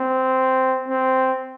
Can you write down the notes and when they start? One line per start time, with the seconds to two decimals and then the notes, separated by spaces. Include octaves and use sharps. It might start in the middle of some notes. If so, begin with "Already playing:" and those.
Already playing: C4
0.88 C4